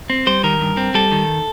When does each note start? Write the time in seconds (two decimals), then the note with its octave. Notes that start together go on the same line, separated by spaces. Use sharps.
0.10 C4
0.27 G3 C5
0.43 D#3 A#4
0.61 G2
0.77 C4
0.94 G3 A4
1.12 D#3